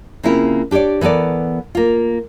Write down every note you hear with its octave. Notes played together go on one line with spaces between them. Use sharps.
C#3 A#3 C4 E4 F4
D4 G4 B4 C#5 D5
E3 B3 A4 A#4 D5
A#3 F4